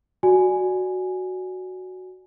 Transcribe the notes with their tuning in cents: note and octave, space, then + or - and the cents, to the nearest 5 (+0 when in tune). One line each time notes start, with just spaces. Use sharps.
F#4 +0 D5 +15 G#5 +0